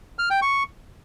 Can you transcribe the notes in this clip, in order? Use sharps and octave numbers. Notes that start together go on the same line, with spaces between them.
F6
G5
C#6